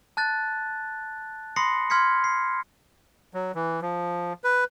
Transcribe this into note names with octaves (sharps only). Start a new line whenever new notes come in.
A5 F#6 A6
B5 C6 D#6 A#6 C7 C#7
C6 F6 G#6 B6 C#7
C7
F#3
E3
F3
B4